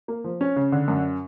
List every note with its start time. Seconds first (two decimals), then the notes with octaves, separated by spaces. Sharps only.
0.08 A#3
0.24 F3
0.41 C#4
0.56 C#3
0.72 D3
0.88 F#2